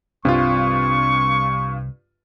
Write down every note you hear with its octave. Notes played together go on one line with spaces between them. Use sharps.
C2 G2 C3 C4 F4 C#6